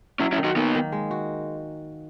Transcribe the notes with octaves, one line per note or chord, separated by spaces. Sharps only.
F#3 C#4 E4
C#4 E4
D#3
D#4 F#4
A#3 B3 D#4
D#3
G#3
F#4